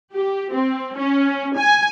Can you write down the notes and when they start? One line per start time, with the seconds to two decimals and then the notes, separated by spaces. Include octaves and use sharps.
0.13 G4
0.53 C4
0.98 C#4
1.58 G#5